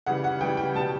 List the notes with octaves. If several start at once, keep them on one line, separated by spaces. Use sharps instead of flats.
C#3 E3 G3 F#5
F#5
C#3 E3 G3 G5
G5
B2 G3 A5